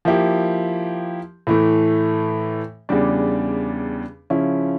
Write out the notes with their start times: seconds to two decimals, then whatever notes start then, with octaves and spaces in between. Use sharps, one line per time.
0.05 F3 A#3 E4 G4
1.47 A2 E3 A3
2.89 E2 C#3 G3 D4
4.30 C#3 F3 C#4 E4